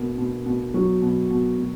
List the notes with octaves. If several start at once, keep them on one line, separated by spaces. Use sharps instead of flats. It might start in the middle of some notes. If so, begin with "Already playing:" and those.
Already playing: B2 A#3
B2
B2
F#3
B2
B2
B2